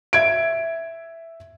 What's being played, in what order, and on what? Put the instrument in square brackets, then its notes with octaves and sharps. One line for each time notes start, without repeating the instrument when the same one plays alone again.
[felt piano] E5 G#6 D7